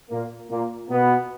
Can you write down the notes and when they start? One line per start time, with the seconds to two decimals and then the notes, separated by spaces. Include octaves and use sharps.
0.10 A#2 A#3
0.50 A#2 A#3
0.90 B2 B3